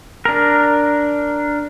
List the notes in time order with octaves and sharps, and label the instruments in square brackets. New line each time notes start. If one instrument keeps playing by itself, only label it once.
[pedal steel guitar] D4 A#4